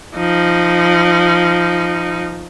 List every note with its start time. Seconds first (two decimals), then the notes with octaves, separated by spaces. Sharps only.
0.16 F3 D#4